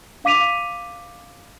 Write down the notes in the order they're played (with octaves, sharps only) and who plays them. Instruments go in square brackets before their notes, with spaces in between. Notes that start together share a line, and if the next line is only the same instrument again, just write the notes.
[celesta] D4 F5 D6 B6 D#7 F7